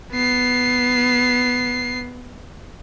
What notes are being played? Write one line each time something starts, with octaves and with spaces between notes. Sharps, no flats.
B3 C7